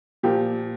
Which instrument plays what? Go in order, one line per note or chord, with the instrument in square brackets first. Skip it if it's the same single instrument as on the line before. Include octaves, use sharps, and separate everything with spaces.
[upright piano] A#2 F3 G4